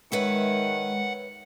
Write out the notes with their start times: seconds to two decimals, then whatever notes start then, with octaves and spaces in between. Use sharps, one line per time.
0.12 D#3 G#3 B4 C#5 E5 F#5